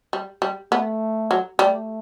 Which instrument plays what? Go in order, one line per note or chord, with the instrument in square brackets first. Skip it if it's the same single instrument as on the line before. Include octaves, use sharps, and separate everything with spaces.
[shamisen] G3
G3
[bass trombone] A3 [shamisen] B3
[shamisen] F#3
[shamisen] G3 [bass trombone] A3